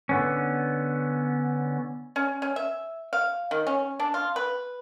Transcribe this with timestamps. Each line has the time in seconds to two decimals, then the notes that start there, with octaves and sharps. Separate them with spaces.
0.09 D3 B3 C#4
2.16 C#4
2.42 C#4
2.56 E5
3.13 F5
3.51 D#3
3.67 C#4
4.00 D4
4.14 F4
4.36 B4